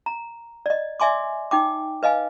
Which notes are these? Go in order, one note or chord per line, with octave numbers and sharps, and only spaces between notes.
A#5
D5 D#5
D5 E5 G#5 C6 D6
D#4 G5 D6
B4 D#5 F5 G#5